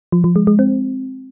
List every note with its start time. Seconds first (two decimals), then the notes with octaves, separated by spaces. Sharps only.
0.12 F3
0.24 F3
0.36 G#3
0.47 G#3
0.59 C4